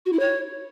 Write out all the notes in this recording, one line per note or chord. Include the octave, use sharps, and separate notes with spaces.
F#4
E4
C#5